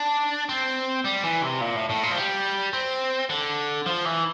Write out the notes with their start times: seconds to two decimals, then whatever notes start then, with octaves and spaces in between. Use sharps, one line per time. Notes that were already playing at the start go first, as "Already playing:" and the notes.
Already playing: D4
0.49 C4
1.05 G3
1.24 E3
1.43 C3
1.61 A#2
1.76 A2
1.90 A2
2.03 A#2
2.11 F3
2.18 G3
2.73 C4
3.30 D3
3.86 F3
4.05 E3